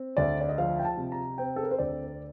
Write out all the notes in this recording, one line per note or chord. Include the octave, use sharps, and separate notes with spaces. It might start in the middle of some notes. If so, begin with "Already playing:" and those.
Already playing: C4
D2 D5
D5
D#5
F3 F5
G5
A5
C3
A#5
C4 G5
A4
A#4
C5
D2 D5